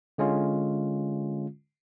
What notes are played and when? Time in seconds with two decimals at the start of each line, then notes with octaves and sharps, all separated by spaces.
0.18 D3 G#3 C#4 F4